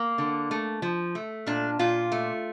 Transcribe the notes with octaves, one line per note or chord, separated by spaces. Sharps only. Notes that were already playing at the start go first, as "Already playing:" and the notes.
Already playing: A#3
D3
A3
F3
A3
A#2 D4
A#2 F4
A3